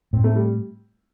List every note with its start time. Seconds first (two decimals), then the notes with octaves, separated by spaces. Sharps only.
0.13 A2 C4
0.24 A3
0.36 G3